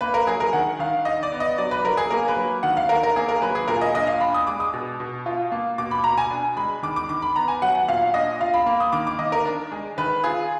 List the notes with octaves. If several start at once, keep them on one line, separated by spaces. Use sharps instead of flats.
A#3 B4
A#4
F#3 G#4
A#4
D#3 F#5
D#3 F5
D#4 D#5
D5
B3
D#5
F#3 D5
B4
F#3 A#4
G#4
A#3 A#4
B4
F#3
D#3 F#5
F5
D#3 A#4
A#4
A#3 G#4
A#4
F#3 B4
G#4
A#2 A#4
D#5
D4 D#5
F5
D4 B5
D#6
G#3 D6
D#6
B2
B2
F4
A#3
B2 D6
B5
B2 A#5
G#5
D4
G#3 B5
D#3 D6
D6
D#3 D6
B5
B3 A#5
G#5
F#3 F#5
F#5
A#2 F5
D4 D#5
F4 F5
B5
A#3 B5
D#6
D#3 D6
D6
D#3 D#5
A#4
D4
G#3
D#3 B4
F4 G#4